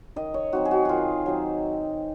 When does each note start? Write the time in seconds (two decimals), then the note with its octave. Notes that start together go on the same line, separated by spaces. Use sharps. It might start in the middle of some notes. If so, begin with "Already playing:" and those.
0.16 D#3 D#5
0.34 C#5
0.53 F#3 C4 D#4 F#4
0.65 G#4
0.71 F#4
0.85 D#3 F4 F#4
1.26 F#3 C4 D#4